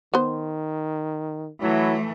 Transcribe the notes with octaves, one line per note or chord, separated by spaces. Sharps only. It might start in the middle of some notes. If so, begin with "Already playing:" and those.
D#3 B3 C5
E3 F#3 A3 E4